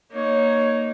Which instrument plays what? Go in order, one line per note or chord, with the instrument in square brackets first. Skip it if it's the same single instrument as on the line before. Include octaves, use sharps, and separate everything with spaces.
[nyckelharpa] A#3 D#4 [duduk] C#5